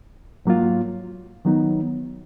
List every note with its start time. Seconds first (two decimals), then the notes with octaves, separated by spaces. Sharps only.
0.45 G#2 F#3 A#3 F4
1.45 D#3 F#3 B3 D#4